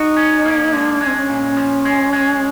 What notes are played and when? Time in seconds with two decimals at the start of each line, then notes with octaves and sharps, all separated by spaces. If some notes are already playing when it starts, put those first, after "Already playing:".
Already playing: D#4 F#4
0.17 C#4
0.45 A#3
0.73 G#3 D4
1.01 G#3
1.06 C4
1.14 D4
1.19 C#4
1.29 A#2
1.57 F3
1.85 G#3
2.13 G#3